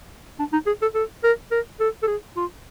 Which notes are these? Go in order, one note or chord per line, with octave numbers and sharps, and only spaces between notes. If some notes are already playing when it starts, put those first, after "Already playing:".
D4
D#4
G#4
A4
A4
A#4
A#4
A4
A4
G#4
F4